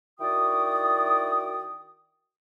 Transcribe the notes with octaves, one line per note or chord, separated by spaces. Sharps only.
D#3 E4 F#4 D5 G5 D#6